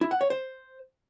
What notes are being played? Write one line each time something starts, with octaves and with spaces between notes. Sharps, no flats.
E4
F#5
C#5
C5